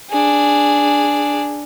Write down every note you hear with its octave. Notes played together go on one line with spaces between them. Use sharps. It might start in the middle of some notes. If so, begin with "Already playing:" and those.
D4 G#4